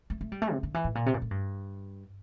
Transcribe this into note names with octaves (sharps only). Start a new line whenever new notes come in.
A3
A3
G3
A3
C3
D3
E3
A2
A#2
C3
A#2
A2
G2